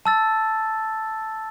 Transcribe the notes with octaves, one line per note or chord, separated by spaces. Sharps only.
A5 E6 A6